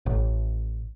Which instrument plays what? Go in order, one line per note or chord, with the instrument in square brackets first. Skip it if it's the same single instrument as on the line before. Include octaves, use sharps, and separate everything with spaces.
[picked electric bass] A1